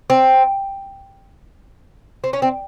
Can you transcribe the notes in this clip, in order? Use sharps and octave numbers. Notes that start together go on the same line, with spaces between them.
C4
C4
C#4
C4